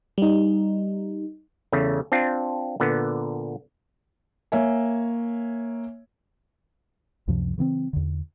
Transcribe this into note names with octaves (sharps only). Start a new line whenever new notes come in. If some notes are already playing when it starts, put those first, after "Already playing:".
G3 D#4
E2 C#3 A3
C4 D4 F4
A#2 D3 B3
A#3 C#5 E5 G#5
C#2 F#2 C3 F3
C#3 E3 B3 C4
E2 D3